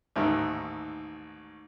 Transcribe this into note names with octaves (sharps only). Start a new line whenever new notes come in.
A1 D#2 G#2 D#3